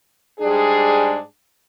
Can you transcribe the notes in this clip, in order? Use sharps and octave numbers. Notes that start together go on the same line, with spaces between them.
G#2 G3 D4 G#4